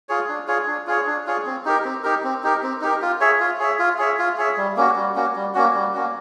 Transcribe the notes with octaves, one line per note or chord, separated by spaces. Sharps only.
F4 G#4 C#5
D4
F4 G#4 C#5
D4
F4 G#4 C#5
D4
F4 G#4 C#5
C4
D#4 G4 A#4
C4
D#4 G4 A#4
C4
D#4 G4 A#4
C4
D#4 G4 A#4
F4
G#4 C#5 E5
F4
G#4 C#5 E5
F4
G#4 C#5 E5
F4
G#4 C#5 E5
G3
A#3 C#4 F#4
G3
A#3 C#4 F#4
G3
A#3 C#4 F#4
G3
A#3 C#4 F#4